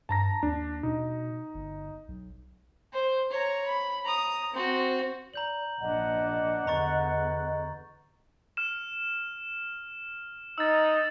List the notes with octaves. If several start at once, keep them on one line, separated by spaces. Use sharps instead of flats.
G2 A5 A#5 A#6
D#2 D4
B2 D#4
G1
B1
C5
C#5 A#5
B5
A#5 D#6
C4 F#4
D5 A#5 G6 F#7
A#1 D4 D#5 F#5
E2 D3 A#5 C#6 A6
F6 E7
D#4 E6 A6